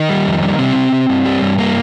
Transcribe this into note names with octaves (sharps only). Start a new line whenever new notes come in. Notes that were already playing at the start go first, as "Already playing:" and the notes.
Already playing: D#3 D#4
G3
F2
G3
C3 G3 C4
C3
C3
G2
G3
G2
G3 A#3